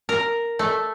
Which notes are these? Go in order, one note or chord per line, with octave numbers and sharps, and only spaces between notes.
A#4
A3